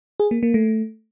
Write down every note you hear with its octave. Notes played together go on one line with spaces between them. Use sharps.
G#4
A#3
A#3
A3